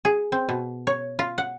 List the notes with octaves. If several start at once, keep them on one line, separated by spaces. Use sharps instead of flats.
G#4
C4
B2
C#5
F4
F#5